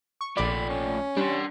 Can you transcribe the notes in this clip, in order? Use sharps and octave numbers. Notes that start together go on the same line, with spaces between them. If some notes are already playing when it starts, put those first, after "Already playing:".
C#6
A#1 A3 F4 D5 B5
C#4
G3 D4 C6